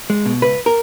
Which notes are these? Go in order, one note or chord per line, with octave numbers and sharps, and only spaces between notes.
G#3
B2
C#2 B4
A#4